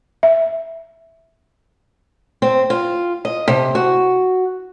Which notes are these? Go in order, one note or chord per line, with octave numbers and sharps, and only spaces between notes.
E5
C4
F4
D#5
C3
F#4